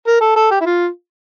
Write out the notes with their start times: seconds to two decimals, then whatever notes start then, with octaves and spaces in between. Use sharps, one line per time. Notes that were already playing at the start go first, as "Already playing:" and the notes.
0.07 A#4
0.21 A4
0.36 A4
0.51 G4
0.61 E4
0.66 F4